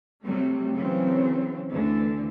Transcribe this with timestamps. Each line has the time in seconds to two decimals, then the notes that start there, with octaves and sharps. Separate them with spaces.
0.23 C3 F#3 G3 A3
0.75 C#3 E3 F#3 C4
1.68 D2 D3 E3